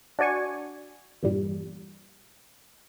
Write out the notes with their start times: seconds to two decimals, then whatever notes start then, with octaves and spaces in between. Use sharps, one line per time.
0.19 D4 F#4 D5 G#5 C#6
1.23 E2 G2 A#2 G3